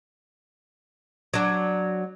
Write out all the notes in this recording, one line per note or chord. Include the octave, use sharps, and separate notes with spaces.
F#3 D4